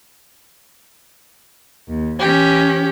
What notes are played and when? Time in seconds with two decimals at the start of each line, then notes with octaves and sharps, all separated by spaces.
1.89 D#2
2.19 E3 C#4 G4